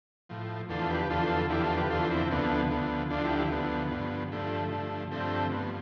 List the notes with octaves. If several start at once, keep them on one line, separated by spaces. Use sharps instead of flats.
A2 F3
E2 D3 F3 F4 A4
G4 B4
E2 D3 F3 F4 A4
E2 D3 F3 E4 G4
F4 A4
G4 B4
E2 D3 F3 F4 A4
C4 E4
D2 D3 F3 B3
D2 D3 F3
D2 D3 F3 D4 F4
E4 G4
E4 G4
D2 D3 F3 B3
G2 D3 F3
G2 D3 F3 A3
G2 D3 F3
G2 D3 F3 A3 C4
G2 F3 B3